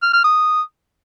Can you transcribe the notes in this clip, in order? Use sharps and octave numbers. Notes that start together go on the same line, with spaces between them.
F6
F6
D#6